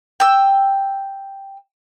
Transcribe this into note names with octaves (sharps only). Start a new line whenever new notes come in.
G5 E6